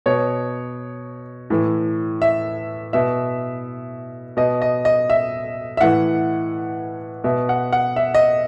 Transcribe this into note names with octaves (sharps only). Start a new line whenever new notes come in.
B2 C#5
A2 E3
E5
B2 E5
B2 D#5
D#5
D#5
E5
E5
A2 E3 F#5
B2 E5
F#5
F#5
E5
D#5